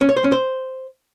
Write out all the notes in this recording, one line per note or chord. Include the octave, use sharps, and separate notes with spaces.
C#4
C#5
C5
C#4
C5